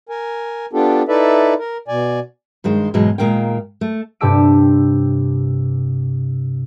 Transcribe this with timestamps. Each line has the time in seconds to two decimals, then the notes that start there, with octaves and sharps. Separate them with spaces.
0.09 A#4 G#5
0.73 B3 D4 F4 G4 A4
1.08 D#4 E4 A4 B4 D5 E5
1.59 A#4
1.88 B2 D5 G#5
2.64 G2 D#3 G#3 C5
2.94 G#2 B2 E3 F#3 G#3
3.18 D#2 A#2 G#3 A#4 F5 G5
3.81 A3
4.21 G2 C3 G4 A5 E6 D7